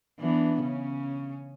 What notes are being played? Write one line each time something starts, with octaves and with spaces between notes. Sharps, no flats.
E3 B3 D4
C#3 C#4